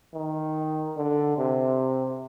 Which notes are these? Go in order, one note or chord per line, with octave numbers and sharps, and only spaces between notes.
D#3
D3
C3